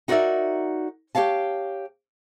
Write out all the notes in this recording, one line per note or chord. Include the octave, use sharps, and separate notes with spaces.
D#4 F#4 A#4 C#5 D5 E5
G4 A4 C#5 F5 A5